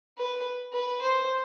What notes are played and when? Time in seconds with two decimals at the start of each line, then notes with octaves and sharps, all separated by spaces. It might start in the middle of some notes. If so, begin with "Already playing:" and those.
0.18 B4
0.73 B4
1.01 C5